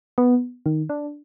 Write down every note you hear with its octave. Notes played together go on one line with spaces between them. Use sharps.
B3
D#3
D4